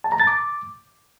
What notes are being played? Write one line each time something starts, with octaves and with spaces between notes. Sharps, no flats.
A5
A#5
A6
D6